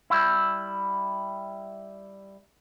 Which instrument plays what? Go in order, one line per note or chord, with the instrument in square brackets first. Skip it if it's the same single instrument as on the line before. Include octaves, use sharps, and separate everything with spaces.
[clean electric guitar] G3 E4